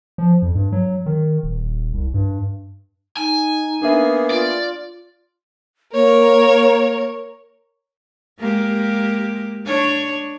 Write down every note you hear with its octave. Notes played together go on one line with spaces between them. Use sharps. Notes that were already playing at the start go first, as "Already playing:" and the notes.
F3
F2
G2
F#3
D#3
D#1
C2
G2
D#4 G#5
A#3 B3 D4 G#4 E5
F4 D5
A#3 A#4 C#5
G#3 A#3 G4
D4 C#5